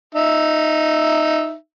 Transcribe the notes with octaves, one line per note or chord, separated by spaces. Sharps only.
D#4 E5